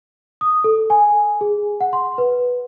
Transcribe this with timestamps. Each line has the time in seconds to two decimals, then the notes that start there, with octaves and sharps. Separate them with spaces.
0.41 D#6
0.64 A4
0.90 G#5
1.41 G#4
1.81 F#5
1.93 C6
2.18 B4